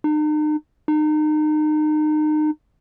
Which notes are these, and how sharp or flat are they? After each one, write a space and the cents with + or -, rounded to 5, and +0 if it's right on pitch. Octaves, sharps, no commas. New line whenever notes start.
D#4 -40
D#4 -30